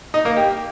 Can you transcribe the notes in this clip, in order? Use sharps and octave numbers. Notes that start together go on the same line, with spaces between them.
D#4
A#3
G4